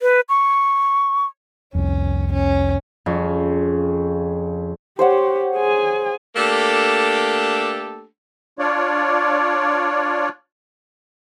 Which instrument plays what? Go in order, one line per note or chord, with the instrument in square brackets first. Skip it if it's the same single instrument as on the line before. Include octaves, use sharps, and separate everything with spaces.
[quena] B4
C#6
[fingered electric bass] C2 F2 [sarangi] C#4
[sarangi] C#4
[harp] F2 [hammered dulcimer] C#3
[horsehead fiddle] G4 [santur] C5 C#5 F#5
[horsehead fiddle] G#4 G#5
[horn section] A3 A#3 D4 G4 A4
[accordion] D4 F4 C#5 D5